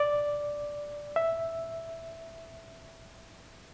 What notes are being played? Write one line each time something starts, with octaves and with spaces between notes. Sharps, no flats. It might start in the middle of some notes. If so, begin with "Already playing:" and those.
Already playing: D5
E5